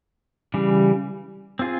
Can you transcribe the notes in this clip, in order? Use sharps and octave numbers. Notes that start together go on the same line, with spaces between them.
C#3 E3 G3
C4 F4 G#4